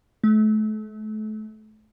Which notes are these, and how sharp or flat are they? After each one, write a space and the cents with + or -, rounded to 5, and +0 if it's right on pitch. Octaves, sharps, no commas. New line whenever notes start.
A3 -35